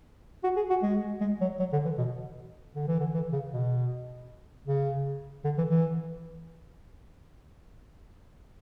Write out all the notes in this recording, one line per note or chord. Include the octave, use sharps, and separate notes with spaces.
F#4
G#4
F#4
G#3
G#3
F#3
F#3
D3
E3
B2
D3
E3
D3
E3
C#3
B2
C#3
D3
E3
E3